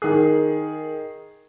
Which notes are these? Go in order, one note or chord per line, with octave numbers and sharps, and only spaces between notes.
D#3 G#4